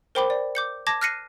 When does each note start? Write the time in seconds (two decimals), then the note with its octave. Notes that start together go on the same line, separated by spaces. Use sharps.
0.15 A#4 C5 G5 B5 D6 G7
0.30 D5
0.55 D6 G6 C#7
0.87 A5 D6 G#6 A#6
1.01 F6 F#6 A#6 C7 C#7 D#7